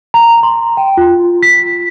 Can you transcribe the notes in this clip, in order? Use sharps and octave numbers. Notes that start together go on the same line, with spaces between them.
A#5
C6
G5
F4
B6